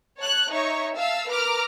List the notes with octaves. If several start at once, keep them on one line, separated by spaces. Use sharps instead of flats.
C#5 A5 F#6
D#4 C#5 E5 C#6
E5 F5 A5 E6
A#4 B4 A#5 D6 F6